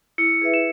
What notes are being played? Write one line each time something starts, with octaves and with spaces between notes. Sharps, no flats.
E4 C#7
G#4 B4 E5
E7